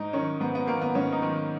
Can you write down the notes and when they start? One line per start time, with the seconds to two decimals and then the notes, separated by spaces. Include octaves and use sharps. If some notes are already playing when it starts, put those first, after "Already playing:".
Already playing: G#2 D#4
0.13 D#3 C#4
0.40 G#2 B3
0.55 B3
0.67 D#3 A#3
0.81 B3
0.95 G#2 C#4
1.12 D#4
1.22 D#3